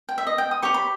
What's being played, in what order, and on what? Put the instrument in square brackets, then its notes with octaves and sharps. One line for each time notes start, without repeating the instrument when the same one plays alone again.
[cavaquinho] G5
E5
D#5
G5
D#6
G4 C#5 C#6
B5